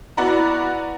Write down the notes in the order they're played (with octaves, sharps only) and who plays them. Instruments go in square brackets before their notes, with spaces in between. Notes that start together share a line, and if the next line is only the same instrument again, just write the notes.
[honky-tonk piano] B3 E4 F#4 D5 A#5 B5